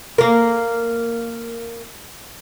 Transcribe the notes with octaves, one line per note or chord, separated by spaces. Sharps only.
A#3 A#4